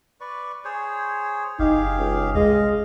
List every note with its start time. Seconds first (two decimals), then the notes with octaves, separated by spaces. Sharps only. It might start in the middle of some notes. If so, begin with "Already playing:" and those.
0.21 B4 D5 C#6
0.65 G#4 C5 C#5
1.59 F#1 D#4 G4 G#4 F5
1.97 C#2
2.35 C2 G#3 D#5 F5